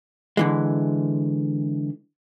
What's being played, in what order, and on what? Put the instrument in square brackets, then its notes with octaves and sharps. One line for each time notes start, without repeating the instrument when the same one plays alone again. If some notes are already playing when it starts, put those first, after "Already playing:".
[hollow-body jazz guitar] D3 E3 G#3